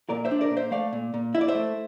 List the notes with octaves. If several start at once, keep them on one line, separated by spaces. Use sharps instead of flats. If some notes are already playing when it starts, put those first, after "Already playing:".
A#2 A#4 D5
C5 E5
D4
A#4 D5
A#2
C5 E5
A3 D5 F5
A#2
A#2
E4 E5
D5
C5 E5
A3